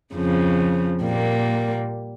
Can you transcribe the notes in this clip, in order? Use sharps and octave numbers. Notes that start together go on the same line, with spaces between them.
F2 C#3 F3
A#2 G3 A#3